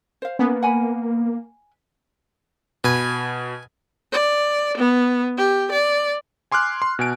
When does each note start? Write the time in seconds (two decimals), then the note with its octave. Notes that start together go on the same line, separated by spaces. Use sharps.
0.22 C5 F5
0.39 A#3 B3 C#4
0.63 F#5 G#5 B5
2.84 B2 B4 G#5
4.12 D5
4.77 B3
5.37 G4
5.72 D5
6.52 G#5 C6 D6 F6 F#6
6.82 C6
6.99 B2 G#5 D7